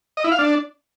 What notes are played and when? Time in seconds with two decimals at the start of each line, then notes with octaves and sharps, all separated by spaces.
0.17 D#5
0.24 E4
0.31 F5
0.39 D4